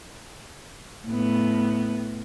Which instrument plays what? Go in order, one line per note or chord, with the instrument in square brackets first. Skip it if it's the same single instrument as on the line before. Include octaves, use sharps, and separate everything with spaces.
[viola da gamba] A2 B3